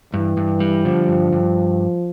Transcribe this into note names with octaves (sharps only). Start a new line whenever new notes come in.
G2 E3
G2
G3
D3 F3
G2
G2